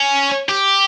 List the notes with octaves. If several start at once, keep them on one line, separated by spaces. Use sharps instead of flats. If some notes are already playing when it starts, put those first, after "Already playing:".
Already playing: C#4
G4